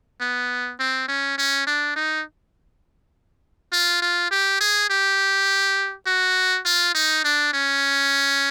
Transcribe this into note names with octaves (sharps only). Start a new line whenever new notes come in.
B3
C4
C#4
C#4
D4
D#4
F4
F4
G4
G#4
G4
F#4
F4
D#4
D4
C#4